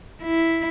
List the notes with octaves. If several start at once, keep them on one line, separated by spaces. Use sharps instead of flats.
E4